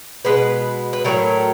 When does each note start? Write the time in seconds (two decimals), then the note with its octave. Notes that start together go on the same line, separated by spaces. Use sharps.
0.25 B2 G#3 B4
0.93 B4
1.05 A2 F#3 A3 A#4